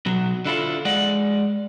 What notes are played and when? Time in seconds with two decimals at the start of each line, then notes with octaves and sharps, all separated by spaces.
0.06 B2 F#3
0.45 D3 E4 F4 A4
0.85 G#3 D5 F#5